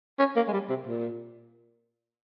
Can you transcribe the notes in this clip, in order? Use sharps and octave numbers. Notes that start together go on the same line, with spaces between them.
C#4
A#3
G#3
G3
C3
A#2